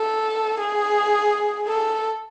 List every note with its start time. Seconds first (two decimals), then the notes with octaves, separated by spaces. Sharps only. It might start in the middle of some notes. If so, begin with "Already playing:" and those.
Already playing: A4
0.60 G#4
1.68 A4